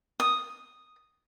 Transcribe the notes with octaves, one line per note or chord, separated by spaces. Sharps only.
D#6